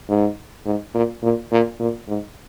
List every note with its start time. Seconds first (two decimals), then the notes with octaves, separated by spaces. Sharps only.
0.09 G#2
0.66 G#2
0.94 A#2
1.23 A#2
1.52 A#2
1.80 A#2
2.08 G#2